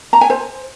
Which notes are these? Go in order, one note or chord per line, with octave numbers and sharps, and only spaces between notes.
A#5
G#5
C5